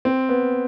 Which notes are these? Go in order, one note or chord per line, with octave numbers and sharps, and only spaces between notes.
C4
B3